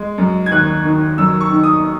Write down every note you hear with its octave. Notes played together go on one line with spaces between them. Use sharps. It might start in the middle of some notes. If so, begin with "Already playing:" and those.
Already playing: G#3
F#2
G#6
D#2 F#6
D#3
F#2 E6
C#6
D#3
D#6